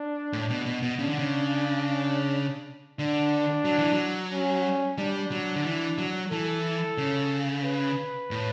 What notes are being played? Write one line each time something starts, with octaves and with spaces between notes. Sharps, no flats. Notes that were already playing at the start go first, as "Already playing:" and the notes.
Already playing: D4
A2
B2
B2
B2
C#3 D4
D3
C#3
D3 D4
F#3
E3
F#3
C#4
G3 D4
F#3
D3
E3
F#3
E3 A4
C#3
B4
A2